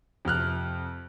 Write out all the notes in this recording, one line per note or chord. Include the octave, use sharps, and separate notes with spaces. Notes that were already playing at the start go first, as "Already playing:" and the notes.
F2 C3 F6 F#6